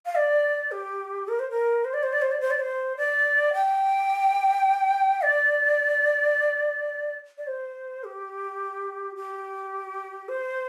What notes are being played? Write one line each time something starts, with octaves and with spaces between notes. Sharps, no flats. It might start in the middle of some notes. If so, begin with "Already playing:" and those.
F5
D5
G4
A#4
C5
A#4
C5
D5
C5
D5
C5
D5
C5
D5
C5
D5
G5
D5
D5
C5
G4
G4
C5